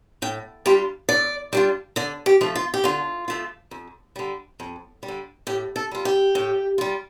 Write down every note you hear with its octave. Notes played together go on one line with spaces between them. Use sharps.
A2 G5
G3 D4 F4 G4
A2 D5
G3 D4 F4
D3 D5
G4
F3 A3 F4
F4
G4
D3 F4
F3 A3 F4
F2
D3 G3
F2
G3
D3
A2 G4
A4
G3 F4
G4
A2
G3 F4